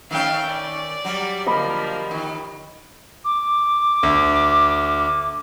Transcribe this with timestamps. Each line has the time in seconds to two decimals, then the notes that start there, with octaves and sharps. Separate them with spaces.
0.11 D#3 A3 C#4 F5 G5
0.49 D5
1.05 F#3 G3
1.47 D3 F3 A#3 D#5 B5
2.11 D#3
3.25 D6
4.03 D2